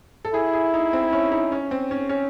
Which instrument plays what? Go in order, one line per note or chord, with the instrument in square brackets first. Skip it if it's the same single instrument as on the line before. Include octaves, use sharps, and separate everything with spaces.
[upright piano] A4
[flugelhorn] E4 [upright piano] G#4
[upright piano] G#4
D#4
C4
C#4
D#4
C#4
C4
C#4
C#4